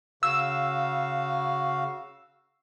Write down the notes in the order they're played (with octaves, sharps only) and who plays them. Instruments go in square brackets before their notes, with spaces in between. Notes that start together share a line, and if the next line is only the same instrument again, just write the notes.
[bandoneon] C#3 F#4 F5 [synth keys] E6